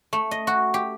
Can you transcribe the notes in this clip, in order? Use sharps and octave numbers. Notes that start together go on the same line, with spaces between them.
A3
D#5
F#4
G4